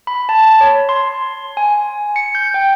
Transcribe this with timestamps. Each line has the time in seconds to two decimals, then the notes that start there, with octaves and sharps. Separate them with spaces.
0.07 B5
0.29 A5
0.61 C#5
0.89 C6
1.57 G#5
2.16 C#7
2.35 G6
2.54 G5